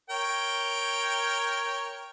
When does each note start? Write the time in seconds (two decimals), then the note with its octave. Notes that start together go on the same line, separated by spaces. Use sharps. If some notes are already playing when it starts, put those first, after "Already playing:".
0.10 A#4 C#5 G5